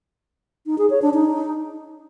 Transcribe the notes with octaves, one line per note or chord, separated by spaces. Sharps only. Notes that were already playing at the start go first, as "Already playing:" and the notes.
D#4
G#4
C#5
D4
D#4